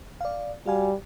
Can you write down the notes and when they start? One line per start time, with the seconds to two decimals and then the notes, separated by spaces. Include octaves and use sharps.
0.21 D5 F5
0.66 G3 F#4 F5 G#5